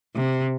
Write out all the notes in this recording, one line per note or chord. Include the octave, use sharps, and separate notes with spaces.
C3